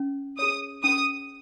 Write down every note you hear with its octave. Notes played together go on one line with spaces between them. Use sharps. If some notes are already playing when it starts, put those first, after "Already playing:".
Already playing: C#4
G#4 C#5 D#6
C#4 D#6